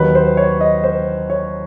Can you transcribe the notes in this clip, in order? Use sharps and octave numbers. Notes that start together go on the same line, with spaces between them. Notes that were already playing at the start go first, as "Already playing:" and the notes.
Already playing: D#2 D#3 F#3 B4
C5
C#5
D#5
C5
C#5